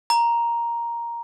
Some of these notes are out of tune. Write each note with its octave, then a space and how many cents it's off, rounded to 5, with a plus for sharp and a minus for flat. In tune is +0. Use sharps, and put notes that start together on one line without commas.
A#5 +5